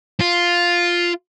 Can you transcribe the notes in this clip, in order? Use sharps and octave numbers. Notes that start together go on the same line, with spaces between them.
F4